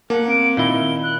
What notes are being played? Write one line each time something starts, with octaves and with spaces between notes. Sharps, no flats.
A#3 A#4 F#5 A5
C4 D7
A#2 D#3 E4 G7
F#6